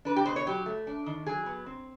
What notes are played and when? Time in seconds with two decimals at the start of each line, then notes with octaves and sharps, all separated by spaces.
0.05 D4 B4
0.16 G4
0.25 B2 C5
0.36 C#5
0.46 F#3 G4
0.66 A3
0.87 D4
1.06 D#3
1.26 F#3 G#4
1.46 B3
1.66 C4